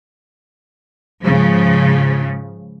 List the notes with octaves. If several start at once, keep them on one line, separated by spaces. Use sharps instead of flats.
G#2 C#3 F3